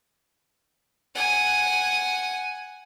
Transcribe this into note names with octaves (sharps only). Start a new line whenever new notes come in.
F#5 G#5